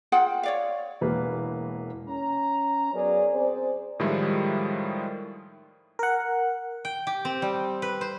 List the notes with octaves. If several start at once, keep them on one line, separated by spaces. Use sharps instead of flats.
F4 G#4 F#5 G5
C#5 D5 F5
E1 E3 A#3 B4
C#4 A#5
F#3 B3 G#4 A#4 C#5 D5
C4 G#4 C5 D5
A2 D#3 F3 G3 G#3 E4
A#4 F#5
G5
G4
C4
G3
B4
C5